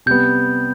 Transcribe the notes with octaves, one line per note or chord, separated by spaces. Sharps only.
C3 G3 B3 G6